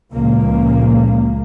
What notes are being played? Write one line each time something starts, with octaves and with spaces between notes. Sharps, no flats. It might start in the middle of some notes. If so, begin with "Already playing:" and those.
C#2 A#2 C#3 F3 A#3